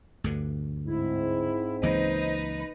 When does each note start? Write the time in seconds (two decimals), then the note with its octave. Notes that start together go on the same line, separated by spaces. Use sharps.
0.24 D2 G2 D3
0.87 G#2 C4 E4
1.83 C#2 E3 A#3 D#4 B4 C5 D#5